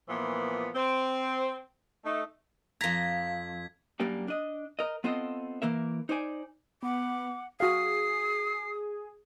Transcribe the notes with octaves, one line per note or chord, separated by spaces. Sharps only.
A#2 E3 F3 B3
C4 C5
A3 D#4
F2 A#5 G#6 B6
F#2 G3 A#3 D4 G4
D4 D#5
A#4 D#5
B3 C4 F4 A4 D#5
E3 A#3 A#4 E5
D#4 C5 D5 G#5
B3 F#5 D6
F#4 G#4 F5 D#6 C7